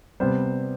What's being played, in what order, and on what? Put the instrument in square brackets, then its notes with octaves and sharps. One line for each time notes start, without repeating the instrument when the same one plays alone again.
[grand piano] C3 G3 B3 C5